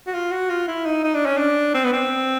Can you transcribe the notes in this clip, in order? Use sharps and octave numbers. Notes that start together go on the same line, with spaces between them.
F#4
F4
F#4
F4
E4
D#4
D#4
D4
C#4
D4
C4
B3
C4